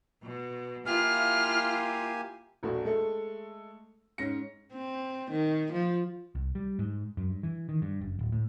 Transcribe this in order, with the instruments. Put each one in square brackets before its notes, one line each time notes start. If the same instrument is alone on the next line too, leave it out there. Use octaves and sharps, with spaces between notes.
[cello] B2
[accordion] A#3 G4 G#5 [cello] E4 F4 [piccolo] F6
[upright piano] E1 A#1 A3 F#4
G#3 A3 A4
G#2 C#4 A#6 C#7
[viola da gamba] C4
D#3
F3
[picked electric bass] C2
G3
G#2
F#2
G2
E3
D#3
G2
F#1
D1
A2